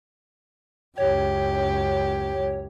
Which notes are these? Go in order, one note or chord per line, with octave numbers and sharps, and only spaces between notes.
C#2 F#2 G4 C#5